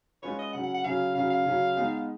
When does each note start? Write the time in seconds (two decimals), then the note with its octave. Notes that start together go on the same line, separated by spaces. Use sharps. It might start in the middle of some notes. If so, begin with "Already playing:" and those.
0.22 G#3 C#4 F4 B4 C#5
0.39 D#5
0.53 C#3 F#3 C#4 F#5
0.63 F#5
0.74 F#5
0.84 C#3 F#3 C#4 F5
1.15 C#3 F#3 C#4 F5
1.30 F5
1.45 C#3 F#3 C#4
1.77 G#3 B3 D#4